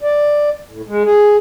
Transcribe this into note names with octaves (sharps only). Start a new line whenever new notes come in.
D5
A2
G#3
G#4